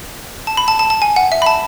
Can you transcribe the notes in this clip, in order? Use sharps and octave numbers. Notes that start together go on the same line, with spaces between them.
A5
B5
A5
A5
A5
G#5
F#5
E5
B5
A5